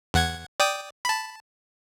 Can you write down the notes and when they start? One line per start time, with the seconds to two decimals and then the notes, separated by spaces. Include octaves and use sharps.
0.14 E2 F#5 G#6
0.60 D5 G5 D#6
1.05 A5 B5